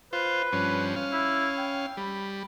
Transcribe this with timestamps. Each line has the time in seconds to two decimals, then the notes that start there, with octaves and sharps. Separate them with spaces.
0.13 F4 B4 C5
0.53 G2 F3 C#4
0.96 C#4 F5
1.13 E4
1.58 G5
1.97 G3 B5